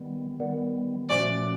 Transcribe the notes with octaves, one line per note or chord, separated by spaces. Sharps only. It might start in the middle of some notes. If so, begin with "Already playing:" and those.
Already playing: D#3 G3 B3
D#3 G3 B3
A#2 F3 A3 C#4 F#4 D5